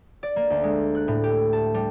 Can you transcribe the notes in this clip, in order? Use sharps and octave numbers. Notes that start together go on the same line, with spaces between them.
D5
A#3
D2
G#3
F#6
A2
G4
A5
G3